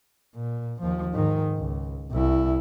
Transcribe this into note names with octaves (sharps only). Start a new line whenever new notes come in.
A#2
D#2 F3
G#2 D#3
C#2
C2 E4